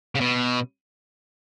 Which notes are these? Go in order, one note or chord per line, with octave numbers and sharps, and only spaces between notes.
C#3
B2